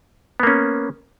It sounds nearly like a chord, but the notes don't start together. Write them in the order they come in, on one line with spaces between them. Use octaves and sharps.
B3 A#3 C#4